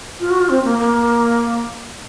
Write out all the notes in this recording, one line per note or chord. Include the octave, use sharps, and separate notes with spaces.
F4
F#4
F4
C4
A#3
A#3